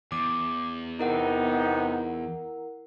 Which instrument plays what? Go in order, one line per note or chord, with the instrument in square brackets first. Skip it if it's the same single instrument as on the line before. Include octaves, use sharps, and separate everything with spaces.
[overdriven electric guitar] E2 [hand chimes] D6
[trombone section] C3 B3 D#4 [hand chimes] E4 A#4 F#5